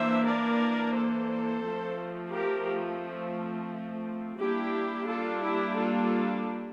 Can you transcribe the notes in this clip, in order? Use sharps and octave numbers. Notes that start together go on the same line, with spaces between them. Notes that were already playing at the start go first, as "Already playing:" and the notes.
Already playing: E3 A#3 D4 C5 E5
A#4 D5
A4 C5
F3 A3 C4
G4 A#4
G3 A#3 D4 E4 G4
F4 A4
E4 G4
F4 A4